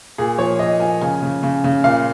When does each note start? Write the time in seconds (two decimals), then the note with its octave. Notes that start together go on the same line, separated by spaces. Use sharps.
0.18 A#2 G#4
0.38 F3 C#5
0.59 A#2 D#5
0.80 F3 G#5
1.01 C#3 G#5
1.22 C#3
1.43 C#3
1.64 C#3
1.84 A#2 F5